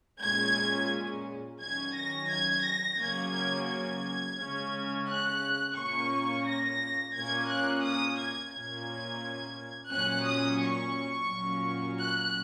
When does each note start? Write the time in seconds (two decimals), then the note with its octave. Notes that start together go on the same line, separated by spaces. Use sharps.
0.22 A#2 G#3 C#4 G#6
1.60 D#3 F#3 C#4 G#6
1.96 A#6
2.31 G#6
2.64 A#6
2.99 C#3 F#3 A#3 C#4 G#6
3.34 G#6
3.68 G#6
4.37 C#3 G#3 C#4
5.08 F#6
5.76 A#2 A#3 C#4 C#6
6.46 A#6
7.15 A#2 A#3 C#4 G#6
7.50 F#6
7.84 D#6
8.19 G#6
8.53 A#2 A#3 C#4 G#6
9.92 A#2 F#3 C#4 F#6
10.26 D#6
10.61 C#6
11.30 A#2 F#3 C#4
12.00 F#6